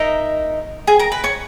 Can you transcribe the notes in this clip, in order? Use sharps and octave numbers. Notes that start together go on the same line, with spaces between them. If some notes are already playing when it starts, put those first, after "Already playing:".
Already playing: D#4 A#4 D#5 E5
G#4 G#5
A#4 A#5
B4 B5
C#5 C#6